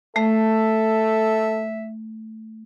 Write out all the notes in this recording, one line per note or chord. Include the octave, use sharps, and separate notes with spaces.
A3 A4 E5